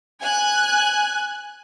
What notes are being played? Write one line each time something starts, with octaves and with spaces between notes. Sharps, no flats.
G#5 F#6